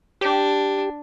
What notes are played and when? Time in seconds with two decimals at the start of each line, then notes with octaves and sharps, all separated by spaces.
0.21 D4 G4